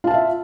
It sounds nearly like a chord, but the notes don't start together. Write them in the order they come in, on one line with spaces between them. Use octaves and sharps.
F4 A5 F5 E5